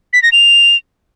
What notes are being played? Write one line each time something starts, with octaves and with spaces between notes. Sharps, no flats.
B6
A#6
F7